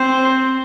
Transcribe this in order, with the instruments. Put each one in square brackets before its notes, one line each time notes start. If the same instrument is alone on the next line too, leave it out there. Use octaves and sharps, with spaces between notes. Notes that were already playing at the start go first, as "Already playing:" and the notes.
Already playing: [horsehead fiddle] C4 [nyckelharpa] C5